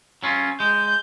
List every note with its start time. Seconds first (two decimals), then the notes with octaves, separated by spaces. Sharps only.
0.23 F#3 C#4 F4
0.60 G#3 G6